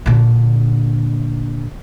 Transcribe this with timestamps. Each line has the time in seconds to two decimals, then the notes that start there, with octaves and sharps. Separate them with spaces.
0.06 A#2 D3